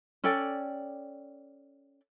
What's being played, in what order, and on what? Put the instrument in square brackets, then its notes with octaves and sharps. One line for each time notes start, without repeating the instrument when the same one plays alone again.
[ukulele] C#4 A4 D5 G5